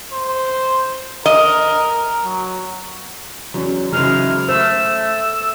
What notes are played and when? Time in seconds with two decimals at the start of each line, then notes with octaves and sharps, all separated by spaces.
0.13 C5
1.26 A#4 D#5
2.25 F#3
3.54 E2 F#3 C#4
3.92 G#2 C#3 E3 F#3 G#3 F6
4.49 A3 C5 E6